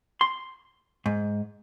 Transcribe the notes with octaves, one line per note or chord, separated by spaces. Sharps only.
C6
G#2